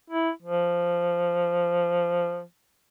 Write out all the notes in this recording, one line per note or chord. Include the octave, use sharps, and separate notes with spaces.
E4
F3